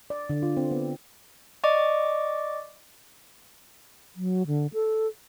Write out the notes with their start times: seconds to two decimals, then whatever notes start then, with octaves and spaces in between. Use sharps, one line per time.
0.10 D5
0.30 D3
0.42 F4
0.57 C4
0.71 B3
1.64 D5 D#5 C#6 D6
4.16 F#3
4.47 D3
4.74 A4